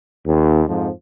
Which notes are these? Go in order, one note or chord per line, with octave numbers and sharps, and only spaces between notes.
D#2
F2 G#2 F3